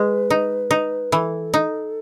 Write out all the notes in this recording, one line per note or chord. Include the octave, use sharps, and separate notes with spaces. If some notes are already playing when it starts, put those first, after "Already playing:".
Already playing: G#3 B4
D#4
D#4
E3 A4
D#4